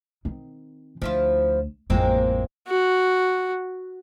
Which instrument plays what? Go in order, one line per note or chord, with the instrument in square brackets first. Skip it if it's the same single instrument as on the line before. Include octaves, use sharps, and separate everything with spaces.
[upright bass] D#3 C4
[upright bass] D2 [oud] F3 E4 F4
[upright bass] A1 F2 [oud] G#3 A#3 C4
[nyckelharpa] F#4